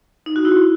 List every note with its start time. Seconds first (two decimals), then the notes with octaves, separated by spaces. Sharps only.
0.26 D#4
0.36 F#4
0.45 E4